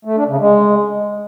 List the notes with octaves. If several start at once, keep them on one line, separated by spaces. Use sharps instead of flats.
A3
D4
C#3
G#3